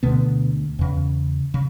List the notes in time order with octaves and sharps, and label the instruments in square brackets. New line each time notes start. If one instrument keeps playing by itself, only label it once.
[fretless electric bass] D2 B2 D3 B3
E2 C#3
C#3